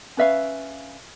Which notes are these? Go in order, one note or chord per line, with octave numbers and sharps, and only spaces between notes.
C#4 B4 E5 F5